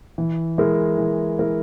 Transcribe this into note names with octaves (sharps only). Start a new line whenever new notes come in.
E3
G#3 E4 A#4
E3
G#3 E4 A#4